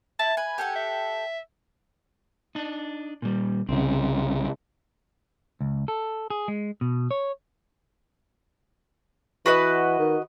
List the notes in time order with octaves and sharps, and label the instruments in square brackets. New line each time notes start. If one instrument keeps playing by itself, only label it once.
[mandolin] E4 [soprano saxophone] A5
[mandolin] B4 [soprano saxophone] G#5
[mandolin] G4 A4 F#5
[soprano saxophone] E5
[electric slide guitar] D4 D#4
A#2 G3
[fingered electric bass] C2 C#3 [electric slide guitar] C4
[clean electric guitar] C#2
A4
G#4
G#3
B2
C#5
[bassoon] E3 [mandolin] F#4 B4 D#5
[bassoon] D#3